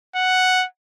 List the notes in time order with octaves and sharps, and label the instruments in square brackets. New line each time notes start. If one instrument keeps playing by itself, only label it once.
[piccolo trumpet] F#5